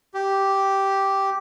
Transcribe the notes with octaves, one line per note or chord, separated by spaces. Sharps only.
G4